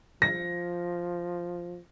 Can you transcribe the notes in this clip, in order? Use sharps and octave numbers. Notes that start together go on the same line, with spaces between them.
F3 A#6